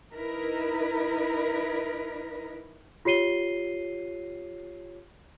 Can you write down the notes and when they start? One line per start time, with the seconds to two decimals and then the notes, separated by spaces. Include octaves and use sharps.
0.13 D#4 E4 A#4 B4
3.05 F4 G4 C#5 C7 D#7 G7